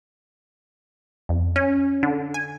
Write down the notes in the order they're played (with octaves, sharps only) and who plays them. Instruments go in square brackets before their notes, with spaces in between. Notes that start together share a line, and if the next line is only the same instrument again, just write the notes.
[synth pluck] F2
C#4
D3
G#5